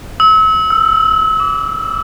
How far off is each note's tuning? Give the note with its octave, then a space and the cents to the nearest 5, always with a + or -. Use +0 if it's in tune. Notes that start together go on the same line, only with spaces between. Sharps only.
E6 -35
E6 +15
D6 -35